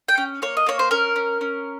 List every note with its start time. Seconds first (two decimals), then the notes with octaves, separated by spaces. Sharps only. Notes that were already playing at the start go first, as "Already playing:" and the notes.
0.08 G5
0.18 C#4
0.42 A#3 C#5
0.57 D#5
0.66 A#3 C#5
0.79 C5
0.91 C#4 A#4
1.16 C#4
1.41 C#4